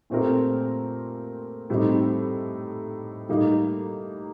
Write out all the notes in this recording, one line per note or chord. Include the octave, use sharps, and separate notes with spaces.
A#2 A3 C4 G4 A#4
A2 G3 C4 D#4
A2 G3 A#3 D#4